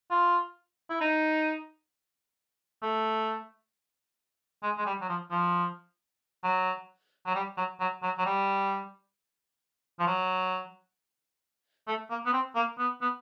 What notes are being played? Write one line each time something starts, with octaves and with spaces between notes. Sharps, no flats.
F4
E4
D#4
A3
G#3
G#3
G3
F#3
F3
F3
F#3
F#3
G3
F#3
F#3
F#3
F#3
G3
F3
F#3
A3
A#3
B3
C4
A#3
B3
B3